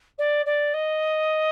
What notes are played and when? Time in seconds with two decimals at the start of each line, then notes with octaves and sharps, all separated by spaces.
0.18 D5
0.45 D5
0.73 D#5